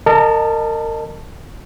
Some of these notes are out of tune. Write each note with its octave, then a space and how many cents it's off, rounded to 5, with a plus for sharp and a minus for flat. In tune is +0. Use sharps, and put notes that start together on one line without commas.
A#4 -30 D#5 -25 A5 +0